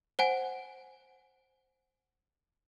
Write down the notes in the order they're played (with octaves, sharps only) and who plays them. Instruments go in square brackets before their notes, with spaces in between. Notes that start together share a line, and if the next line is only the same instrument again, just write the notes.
[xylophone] C5 F#5 G#5